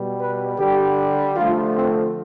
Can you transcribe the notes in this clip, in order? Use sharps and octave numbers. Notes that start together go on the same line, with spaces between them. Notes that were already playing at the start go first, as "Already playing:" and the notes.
Already playing: B2 G3
B4
D3 G3 G4
D3 F3 A3 F4
C4